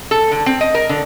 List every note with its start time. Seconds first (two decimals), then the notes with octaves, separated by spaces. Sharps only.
0.11 A4
0.31 D3
0.46 C4
0.61 D#5
0.74 A#4
0.89 D3